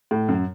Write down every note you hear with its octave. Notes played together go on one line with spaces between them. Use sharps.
A2
F#2